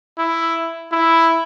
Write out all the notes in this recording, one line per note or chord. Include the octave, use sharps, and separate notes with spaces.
E4
E4